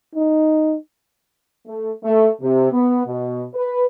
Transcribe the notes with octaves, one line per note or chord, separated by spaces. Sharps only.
D#4
A3
A3
C3
B3
B2
B4